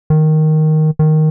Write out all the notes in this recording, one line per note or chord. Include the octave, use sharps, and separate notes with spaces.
D#3
D#3